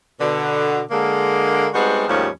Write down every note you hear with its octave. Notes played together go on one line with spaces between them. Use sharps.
B2 D3
D3 G#3 A#3
G3 G#3 B3 C4 D#4 F#4
D#2 G#2 F3 G3 A3 C#4